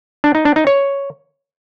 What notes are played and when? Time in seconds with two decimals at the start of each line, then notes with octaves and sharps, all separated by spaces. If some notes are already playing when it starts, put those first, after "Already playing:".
0.24 D4
0.35 D#4
0.45 D4
0.56 D#4
0.67 C#5